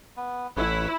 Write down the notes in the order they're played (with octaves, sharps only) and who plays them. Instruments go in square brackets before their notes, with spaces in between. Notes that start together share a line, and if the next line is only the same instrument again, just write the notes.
[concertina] B3
[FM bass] A1 [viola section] E4 [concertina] B4 C#5